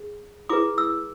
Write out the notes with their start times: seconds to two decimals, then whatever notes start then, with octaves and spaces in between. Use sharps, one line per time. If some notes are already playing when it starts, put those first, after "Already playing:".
Already playing: G#4
0.49 E4 G#4 B4 D6
0.78 E6